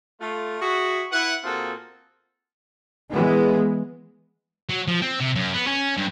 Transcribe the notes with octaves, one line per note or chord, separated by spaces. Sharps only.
A3 F4
F#4 G#4 E5
E4 B4 F#5
A#2 C4 F4 F#4 G#4 A4
E3 G#3 B3
F#3
F3
C4
C3
F#2
B3
C#4
G2